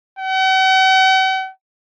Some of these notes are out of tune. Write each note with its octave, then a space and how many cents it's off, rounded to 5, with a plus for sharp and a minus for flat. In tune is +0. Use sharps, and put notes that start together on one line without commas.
F#5 +45